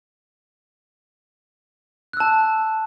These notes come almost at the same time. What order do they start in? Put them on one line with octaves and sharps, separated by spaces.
F#6 E6 A5